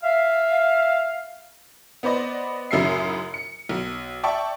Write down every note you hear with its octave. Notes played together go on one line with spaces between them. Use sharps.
E5 F5
B3 B4 C5 D5 D#5
A1 F#2 C#3 D#4 E5 C7
C#7
B1
D5 E5 G5 A5 C#6